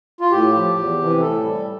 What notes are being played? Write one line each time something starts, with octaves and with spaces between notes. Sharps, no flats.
F4
A2 G4
F3
E2
C3 E3
A2 A4
G3